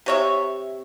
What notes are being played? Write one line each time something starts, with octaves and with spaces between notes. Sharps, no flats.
C3 C#5 E5